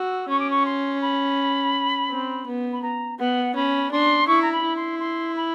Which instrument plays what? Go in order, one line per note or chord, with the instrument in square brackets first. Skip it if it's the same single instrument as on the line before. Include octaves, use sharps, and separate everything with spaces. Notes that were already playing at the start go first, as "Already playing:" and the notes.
Already playing: [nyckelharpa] F#4 [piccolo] E6
[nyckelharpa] C#4 [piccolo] C#6
[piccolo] D6
C#6
C6
B5
[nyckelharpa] C4
B3
[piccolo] B5
A#5
[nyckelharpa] B3 [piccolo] F#5
[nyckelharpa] C#4 [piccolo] B5
[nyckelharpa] D4 [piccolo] C6
[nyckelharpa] E4 [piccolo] C#6
[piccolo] A#5
B5
[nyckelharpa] E4
[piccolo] C6
C6
B5